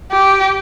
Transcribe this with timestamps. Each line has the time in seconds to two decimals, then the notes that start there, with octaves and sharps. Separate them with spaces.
0.12 G4